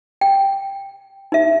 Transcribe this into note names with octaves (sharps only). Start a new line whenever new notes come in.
G5
D#4 E5